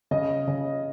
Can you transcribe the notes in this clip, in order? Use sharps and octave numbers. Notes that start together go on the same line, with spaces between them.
C#3 D#5
C#3